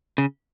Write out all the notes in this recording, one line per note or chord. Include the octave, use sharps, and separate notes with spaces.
C#3